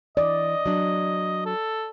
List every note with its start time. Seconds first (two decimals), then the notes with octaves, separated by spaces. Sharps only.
0.17 E3 D5 D#5
0.66 F#3 D4
1.45 A4